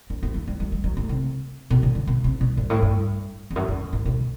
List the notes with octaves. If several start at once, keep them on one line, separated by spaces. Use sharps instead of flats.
D4
B3
A3
G3
F#3
E3
F#3
A3
C3
B2
D3
F#3
B2
C3
B2
G2
A2
G2
E2
F#2
F#2
A2
B2